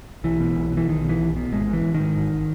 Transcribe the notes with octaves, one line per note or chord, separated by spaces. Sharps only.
B1 E3
B2
B1
B2 E3
B1 D#3
B2
E3
B1
B2
G#1 G#3
G#2
E3
G#1
D#3
G#2
G#1